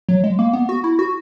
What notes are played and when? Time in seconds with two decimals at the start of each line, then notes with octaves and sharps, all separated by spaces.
0.09 F#3
0.24 G#3
0.39 A#3
0.53 B3
0.69 F#4
0.84 E4
0.99 F#4